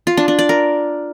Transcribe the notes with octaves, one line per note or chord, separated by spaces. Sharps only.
F4
D4
D4
D5
A#4